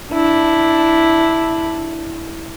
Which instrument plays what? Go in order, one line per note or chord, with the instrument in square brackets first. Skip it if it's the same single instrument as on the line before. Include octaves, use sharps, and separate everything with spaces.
[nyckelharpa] D4 E4